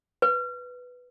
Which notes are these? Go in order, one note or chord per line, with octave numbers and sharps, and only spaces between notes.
B4